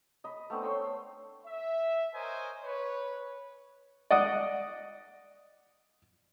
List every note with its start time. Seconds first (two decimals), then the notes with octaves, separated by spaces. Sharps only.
0.24 D#5 B5
0.50 A3 B3 C4 D4
0.63 C#5 C6 E6
1.46 E5
2.15 A#4 C5 C#5 D#5 G#5
2.64 B4 C#5
4.11 D5 D#5 F#5 D#6